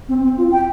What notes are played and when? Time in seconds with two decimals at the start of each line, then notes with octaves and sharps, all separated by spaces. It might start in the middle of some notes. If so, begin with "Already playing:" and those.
0.09 C4
0.23 C4
0.37 F4
0.51 G5